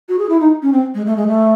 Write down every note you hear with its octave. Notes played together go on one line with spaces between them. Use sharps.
F#4
G#4
E4
D#4
C#4
C4
G#3
A3
G#3
A3